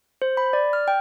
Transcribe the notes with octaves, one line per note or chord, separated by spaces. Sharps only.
C5
B5
D5
F6
G5